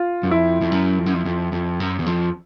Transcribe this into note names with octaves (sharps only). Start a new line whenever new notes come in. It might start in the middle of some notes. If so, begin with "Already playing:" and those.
Already playing: F4
F#2
F2 E4
F2
F#2
F2
F#2
F2
F2
F2
F#2
E2
F2